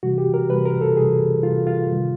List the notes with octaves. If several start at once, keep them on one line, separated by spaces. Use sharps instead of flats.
C3 E3 G3 F#4
G4
A#4
C3 E3 G3 B4
A#4
A4
C3 E3 G3 G#4
C3 E3 G3 F4
F4
C3 D#3 G3